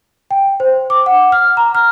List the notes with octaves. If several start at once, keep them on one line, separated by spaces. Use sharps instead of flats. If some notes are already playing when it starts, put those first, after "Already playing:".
G5
C5
D6
F#5
F6
A#5
F6